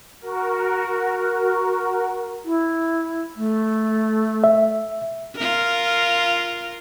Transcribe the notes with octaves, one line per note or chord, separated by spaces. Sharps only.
F#4 A#4
E4
A3
E5
F4 A#4